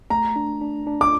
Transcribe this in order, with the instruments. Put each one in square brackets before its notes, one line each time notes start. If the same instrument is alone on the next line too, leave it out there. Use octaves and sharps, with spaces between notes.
[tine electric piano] A3 [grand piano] A#5
[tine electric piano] D4
D4
D4
[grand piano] D6